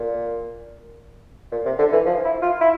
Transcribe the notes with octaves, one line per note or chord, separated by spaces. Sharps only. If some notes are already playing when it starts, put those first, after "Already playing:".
Already playing: A#2
A#2
C3
D3
E3
F3
E4
F4
E4